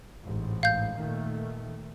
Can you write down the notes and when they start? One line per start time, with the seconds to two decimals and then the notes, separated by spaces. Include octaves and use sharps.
0.22 A1 G#2
0.63 F5 G6
0.97 A#2 D#3 A3